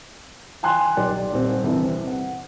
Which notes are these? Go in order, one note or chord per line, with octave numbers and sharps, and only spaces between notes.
G5 G#5 C6 F#6
B1 G4 D5
D#1 C4
C2 C3 E3
F#5